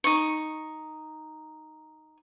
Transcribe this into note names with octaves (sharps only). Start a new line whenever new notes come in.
D#4 C#6